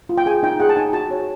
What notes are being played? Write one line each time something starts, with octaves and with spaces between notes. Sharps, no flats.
F4
G5
G#4 G#5
D#4 G5
G#4 F#5
A5
D#4 G#5
F#4 A5
C#5